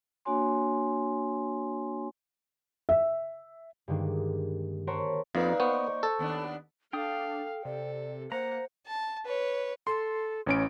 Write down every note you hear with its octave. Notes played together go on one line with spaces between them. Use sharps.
A#3 D4 F#4 C#5 G#5 C6
E5
G2 D3 D#3 G#3 A#3
A#4 C5 C#5 F#5 A5 B5
F2 A#3 D#4 B4 D5 F5
B3 C5 C#6
A4
D#2 B3 D4
D4 A4 F5 G5 D#6
C3 A4 D5
A#3 C5 F#5 A#5
A5
B4 C#5
A4 C6
A1 C#4 D7